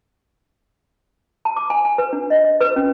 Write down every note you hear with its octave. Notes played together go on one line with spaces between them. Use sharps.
A5
D6
G#5
G#5
B4
D4
D#5
D#5
B4
C#4